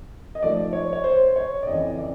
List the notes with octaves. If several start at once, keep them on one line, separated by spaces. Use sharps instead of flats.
D#5
G#2 F3 A3 D5
C#5
C#5
C5
C#5
D5
F2 C#3 E3 D#5
D5